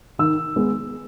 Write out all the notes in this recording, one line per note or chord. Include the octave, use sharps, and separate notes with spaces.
D#3 E6
G#3 B3